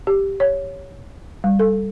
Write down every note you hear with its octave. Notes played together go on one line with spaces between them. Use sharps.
G4
C#5
G3
A4